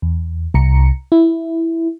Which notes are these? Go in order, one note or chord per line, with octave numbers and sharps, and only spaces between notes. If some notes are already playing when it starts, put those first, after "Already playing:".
E2
C2 A#5 C#7
E4